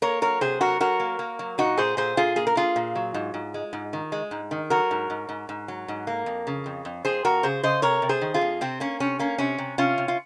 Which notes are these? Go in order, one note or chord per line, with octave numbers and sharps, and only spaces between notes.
A#3 A#4 C#5
F#3 A#4 C#5
C3 G#4 C5
F#3 F#4 A#4
F#3 F#4 A#4
A#3
A#3
F#3
A#2 D#4 F#4
A#2 G#4 C5
A#2 G#4 C5
A#2 F4 G#4
A#3 G#4
A#4
A#3 F4 G#4
A#2
F#3
G#2
G#2
G#3
G#2
D#3
G#3
G#2
D#3
F#3 F#4 A#4
G#2
G#2
G#2
G#2
F#3
G#2
A#3
F2
C#3
F2
F2
F2 G#4 C5
F2 F#4 A#4
C#3 G#4 C5
C#3 C5 D#5
C3 A#4 C#5
C3
G#4 C5
D#3
F4 G#4
F2
C3 C4
A#3 C#4
C3 C#4
A#3 C#4
C3 C#4
C3
C3 C#4 F4
C3
F4